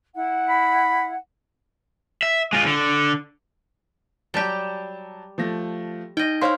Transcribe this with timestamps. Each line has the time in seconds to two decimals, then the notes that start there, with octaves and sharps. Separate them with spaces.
0.14 E4 F#5
0.49 B5
2.23 E5
2.53 G#3 F4
2.67 D3
4.34 F#3 G3 G4 A5 A6
5.38 F3 A3 A#6
6.17 D#4 D#5 G5
6.42 E4 C5 C#5 F5 C6 F6